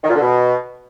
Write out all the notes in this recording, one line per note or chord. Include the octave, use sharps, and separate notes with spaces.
D#3
A#2
D3
B2